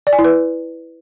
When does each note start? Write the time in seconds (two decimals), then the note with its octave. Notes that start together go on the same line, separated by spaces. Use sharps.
0.07 D5
0.13 G#5
0.19 E4
0.24 B4